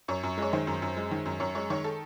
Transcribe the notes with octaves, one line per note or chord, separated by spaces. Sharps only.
F#2 C#5
F#2
G#3 C#5
D#3 C5
F#2
F#2
G#3
D#3
F#2
F#2 C#5
G#3 C#5
D#3 C#5
A4